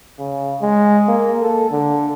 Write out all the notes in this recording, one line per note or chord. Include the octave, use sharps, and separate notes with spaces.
C#3
G#3
A#3
A4
D3